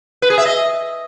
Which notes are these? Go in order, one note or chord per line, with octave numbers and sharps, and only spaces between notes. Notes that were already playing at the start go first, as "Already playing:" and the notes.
B4
G#4
E5
D#5